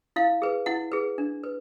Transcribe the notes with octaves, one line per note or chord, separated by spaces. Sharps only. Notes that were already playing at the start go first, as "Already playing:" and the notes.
E4 F5
G#4 B4
E4 F#5
G#4 B4
D4
B4